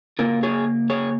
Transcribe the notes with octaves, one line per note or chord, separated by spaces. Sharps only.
C#3 A#3 F4 A#4
G#4 C#5
G#4 C#5